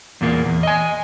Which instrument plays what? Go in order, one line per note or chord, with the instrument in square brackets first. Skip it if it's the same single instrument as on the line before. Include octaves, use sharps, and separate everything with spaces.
[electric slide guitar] E2 A#2 A#3
E2
D#5 G#5